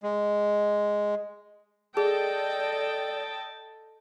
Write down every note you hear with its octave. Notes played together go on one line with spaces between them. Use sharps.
G#3
G#4 A4 D5 D#5 G5 A5